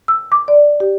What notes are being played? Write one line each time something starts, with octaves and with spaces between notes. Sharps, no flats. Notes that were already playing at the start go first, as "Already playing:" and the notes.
E6
D6
D5
G4